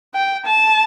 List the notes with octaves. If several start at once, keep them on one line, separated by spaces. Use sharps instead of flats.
G5
A5